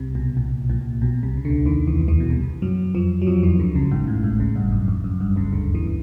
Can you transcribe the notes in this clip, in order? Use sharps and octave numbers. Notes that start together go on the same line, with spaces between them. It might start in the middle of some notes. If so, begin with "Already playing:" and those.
Already playing: C2 C3
B1 B2
A#1 A#2
A#1 A#2
B1 B2
C2 C3
C#3
D2 D3
D#2 D#3
E2 E3
E2 E3
B2
C2 C3
F#2 F#3
F2 F3
F#3
F2 F3
E2 E3
D2 D3
C#2 C#3
G#1 G#2
A1 A2
G#1 G#2
C#2 C#3
G1 G2
F#2
F2
F#2
G1 G2
C#2 C#3
D2 D3
E2 E3